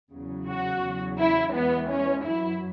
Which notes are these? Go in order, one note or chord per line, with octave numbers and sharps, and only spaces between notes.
E2 C#3 F#3
F#4
E2 C#3 F#3
E4
E2 E3 G#3 B3
C#4
F#2 F#3 E4